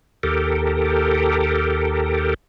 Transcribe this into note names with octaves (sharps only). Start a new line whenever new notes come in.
D#2 G4 A4 A#4